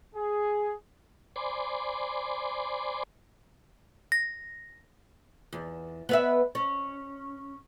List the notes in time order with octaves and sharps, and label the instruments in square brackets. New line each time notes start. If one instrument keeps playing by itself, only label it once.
[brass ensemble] G#4
[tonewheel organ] C5 D5 G#5 B5 C6 D6
[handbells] A#6
[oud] E2
B3 B4 E5
C#4